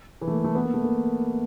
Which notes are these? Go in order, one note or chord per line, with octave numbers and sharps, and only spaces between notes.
E3
A3
A#3
A3
B3
A#3
A3
A#3